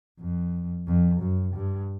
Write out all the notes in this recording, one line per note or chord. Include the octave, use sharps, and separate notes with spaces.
F2
F2
F#2
G2